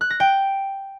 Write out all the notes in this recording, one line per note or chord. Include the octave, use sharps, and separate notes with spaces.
F#6
A#6
G5